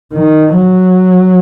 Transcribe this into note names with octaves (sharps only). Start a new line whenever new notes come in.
D#3
F#3